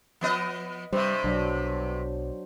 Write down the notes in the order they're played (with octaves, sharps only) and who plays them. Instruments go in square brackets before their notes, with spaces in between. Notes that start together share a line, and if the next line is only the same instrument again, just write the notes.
[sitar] F3 B3 D#5
[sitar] G2 C3 [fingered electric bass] G3 [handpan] C5
[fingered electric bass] B1 [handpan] F#3 D4